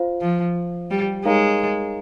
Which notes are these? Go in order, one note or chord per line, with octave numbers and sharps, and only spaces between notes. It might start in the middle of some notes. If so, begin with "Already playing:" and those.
Already playing: F4 C5 F5
F3
G3
G#3 D#4 A#4 C#5 F5 A#5